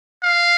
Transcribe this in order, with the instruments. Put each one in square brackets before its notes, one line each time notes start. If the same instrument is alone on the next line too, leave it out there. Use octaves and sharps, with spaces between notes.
[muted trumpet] F5